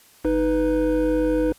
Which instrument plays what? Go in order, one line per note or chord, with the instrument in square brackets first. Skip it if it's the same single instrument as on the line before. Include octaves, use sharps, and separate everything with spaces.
[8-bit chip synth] G1 D#4 B4